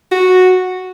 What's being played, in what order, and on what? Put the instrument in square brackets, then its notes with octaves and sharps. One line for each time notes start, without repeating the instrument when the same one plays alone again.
[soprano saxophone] F#4